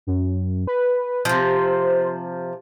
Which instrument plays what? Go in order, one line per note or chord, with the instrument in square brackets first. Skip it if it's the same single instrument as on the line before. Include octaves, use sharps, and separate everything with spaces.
[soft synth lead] F#2
B4
[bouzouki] C3 F3 [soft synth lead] C5